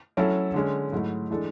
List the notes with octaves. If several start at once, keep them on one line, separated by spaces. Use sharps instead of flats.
F#3 C#4 E4 A4
D3 G#3 C#4
G#2 F#3 A3 E4
E3 G#3 D4 A4